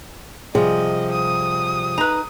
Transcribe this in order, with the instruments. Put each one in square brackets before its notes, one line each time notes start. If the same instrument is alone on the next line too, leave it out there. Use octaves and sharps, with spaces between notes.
[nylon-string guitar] C3 F3 G3 [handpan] G#4 [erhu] D#5
[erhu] D#6
[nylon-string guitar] D#4 [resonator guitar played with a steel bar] B4 A#5